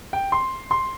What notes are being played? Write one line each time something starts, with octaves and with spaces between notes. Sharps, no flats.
G5
C6
C6